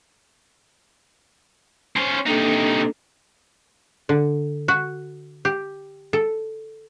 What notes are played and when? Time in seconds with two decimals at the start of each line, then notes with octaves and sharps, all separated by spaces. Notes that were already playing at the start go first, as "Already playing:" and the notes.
1.96 C#4 C5
2.26 C3 A#3 D4 D#4 A4
4.09 D3
4.68 F#4
5.45 G4
6.13 A4